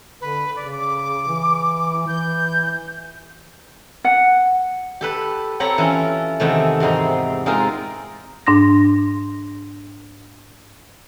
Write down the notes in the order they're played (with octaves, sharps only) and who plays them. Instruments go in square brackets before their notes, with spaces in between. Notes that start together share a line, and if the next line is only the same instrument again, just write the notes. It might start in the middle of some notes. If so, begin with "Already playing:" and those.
[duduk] D3 [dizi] B4
[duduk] C#3 [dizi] D5
[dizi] D6
[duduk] E3
[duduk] E3 [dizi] G6
[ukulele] F#5
[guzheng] G4 A4 B4
C4 G4 A4 C#5 A#5 B5
E3 C#4 F4
E2 C3 D#3 A3
E2 G#2 C4 D#4
G#3 C4 D#4 F4 A#4
[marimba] G#2 D4 C6 A#6